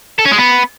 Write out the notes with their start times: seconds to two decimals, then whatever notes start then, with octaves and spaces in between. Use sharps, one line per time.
0.19 A4
0.25 C#4
0.32 G#3
0.38 B3